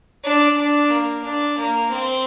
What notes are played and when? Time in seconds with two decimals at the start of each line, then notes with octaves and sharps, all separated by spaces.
0.24 D4
0.57 D4
0.90 A#3
1.24 D4
1.58 A#3
1.91 C4